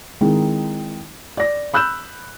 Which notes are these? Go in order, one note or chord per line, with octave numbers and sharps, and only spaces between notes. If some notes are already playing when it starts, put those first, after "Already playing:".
D#3 G#3 C4 D#4 E4
D5 A#6
B5 E6 F#6 G6 E7